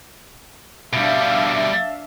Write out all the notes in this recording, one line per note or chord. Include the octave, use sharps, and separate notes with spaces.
B2 G3 D4 E5 F5